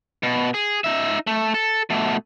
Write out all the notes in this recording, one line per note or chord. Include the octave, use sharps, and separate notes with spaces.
B2
G#4
D#4 E5
A3
A4
B2 A3